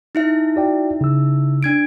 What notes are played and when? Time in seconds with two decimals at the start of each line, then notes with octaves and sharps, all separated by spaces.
0.15 D#4 E4 E5
0.56 F#4 D5 G5
1.01 C#3 E6
1.63 D4 G#6 D7